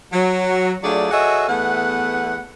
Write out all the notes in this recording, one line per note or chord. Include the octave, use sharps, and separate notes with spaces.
F#3
F#3 A3 D4 F4 G#4 D5
F#4 G#4 A4 C#5 D#5 E5
E2 A3 B3 B4 F#5